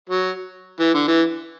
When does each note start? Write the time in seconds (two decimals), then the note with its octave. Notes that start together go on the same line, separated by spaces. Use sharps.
0.09 F#3
0.80 E3
0.94 D3
1.08 E3